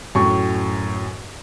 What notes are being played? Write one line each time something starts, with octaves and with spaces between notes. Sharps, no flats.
F#2 A2 C#6